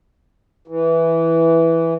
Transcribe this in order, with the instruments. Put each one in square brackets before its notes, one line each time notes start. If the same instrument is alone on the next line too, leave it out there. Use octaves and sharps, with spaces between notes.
[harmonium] E3